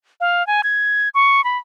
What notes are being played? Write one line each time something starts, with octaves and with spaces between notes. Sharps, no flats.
F5
G#5
G#6
C#6
B5